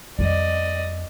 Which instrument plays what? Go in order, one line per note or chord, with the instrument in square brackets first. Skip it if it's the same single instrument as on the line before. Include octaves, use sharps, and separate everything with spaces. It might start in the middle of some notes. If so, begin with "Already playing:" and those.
[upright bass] F2 G3 [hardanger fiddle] D5 D#5